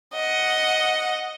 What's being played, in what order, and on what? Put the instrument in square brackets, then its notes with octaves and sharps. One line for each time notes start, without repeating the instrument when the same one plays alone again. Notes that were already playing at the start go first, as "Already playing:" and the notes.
[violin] D#5 F#5